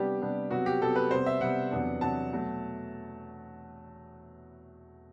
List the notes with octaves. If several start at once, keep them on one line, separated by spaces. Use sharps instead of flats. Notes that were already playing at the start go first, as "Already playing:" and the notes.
Already playing: C3 G3 B3 D4 G4
C3 G3 B3 D4
C3 F#3 B3 F#4
G4
C3 F#3 B3 A4
B4
C3 G3 B3 C5
E5
C3 G3 B3 F#5
E2 C3 F#3 B3 D4
E2 C3 F#3 B3 D4 A5
B2 F#3 A3